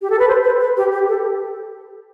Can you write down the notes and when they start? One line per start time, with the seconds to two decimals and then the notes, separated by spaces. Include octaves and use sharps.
0.02 G4
0.10 A4
0.19 B4
0.28 C5
0.44 B4
0.60 B4
0.77 G4
0.92 G4
1.08 A4